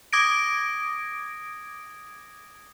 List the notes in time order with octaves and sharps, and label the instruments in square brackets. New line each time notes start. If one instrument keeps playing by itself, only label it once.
[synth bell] D6 D#6 G#6 A#6 D7